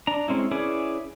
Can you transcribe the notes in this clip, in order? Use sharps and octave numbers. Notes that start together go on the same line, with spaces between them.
D4 A#5
G#3 C4 C#4 E4
C#4 E4 G#4 B4 D5